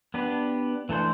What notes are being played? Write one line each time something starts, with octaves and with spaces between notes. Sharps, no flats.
B3 D4 G4 B4
E3 A3 D4 A4 C5